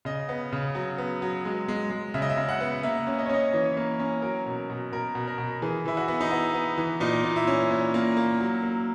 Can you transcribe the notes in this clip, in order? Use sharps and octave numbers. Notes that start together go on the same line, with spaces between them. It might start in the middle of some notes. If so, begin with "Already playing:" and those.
C#3 D#5
B3
C#3
F#3
B3
F#3
G#3
G#3
G#3
C#3 E5
D#5
E5
C#3
F#5
B3
A#3 E5
C#4
D#5
C#5
C#4 D#5
E3 C#5
A#3
C#4
F#3 A#4
B2
B2
B2 A#4
B2
A#4
B2
E3 G#4
E3 E4
F#4
B3
D#4
B3 E4
B3
E3
A#2 D#4
A#2
E4
C#4
A#2
A#3
A#3
F#3
A#3